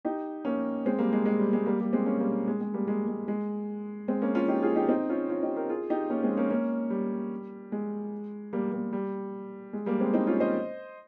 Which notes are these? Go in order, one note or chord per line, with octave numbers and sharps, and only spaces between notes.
D#4 G4
A#3 C#4
G#3 C4
G3 A#3
G#3
G#3
G3
G#3
G3 A#3
G3 A#3
G#3 C4
A#3 C#4
G3 A#3
G#3
G#3
G3 A#3
G#3
G#3
G#3
G#3 C4
A#3 C#4
C#4 F4
D#4 G4
F4 G#4
D#4 G4
C4 D#4
C#4 F4
C#4 F4
D#4 G4
G4 A#4
F4 G#4
D#4 G4
A#3 C#4
G#3 C4
A#3 C#4
A#3 C#4
G3
G#3
G3 A#3
G3 A#3
G3
G#3
G3 A#3
G#3 C4
C4 D#4
C#4 F4
C5 D#5